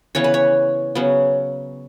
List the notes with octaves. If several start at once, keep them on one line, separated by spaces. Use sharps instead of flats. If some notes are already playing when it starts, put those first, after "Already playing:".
C#3 E3 B3 C#5
B4
C#5
C#3 F#3 B3